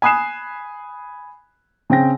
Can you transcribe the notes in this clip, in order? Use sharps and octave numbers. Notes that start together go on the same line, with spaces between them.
G#5 B5 D#6 F#6 C7 E7
C#3 C4 G5 A#6